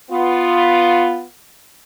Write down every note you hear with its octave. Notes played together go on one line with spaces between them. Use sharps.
B3 F4